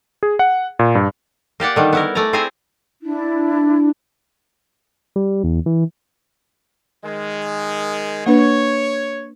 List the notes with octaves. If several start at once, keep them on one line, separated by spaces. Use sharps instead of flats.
G#4
F#5
A#2
G2
A#3 G4 D5 F#5
D3 D#3 G3
B3 E4 A#4
A3 D5 G#5 A#5
C4 E4 G#4 C5 G#5 A#5
D4 E4
G3
E2
E3
D#3 G#3
A#3 D4 B4 C#5